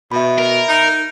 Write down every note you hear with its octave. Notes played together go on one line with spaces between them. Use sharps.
B2 E5 B5
A#4
D#4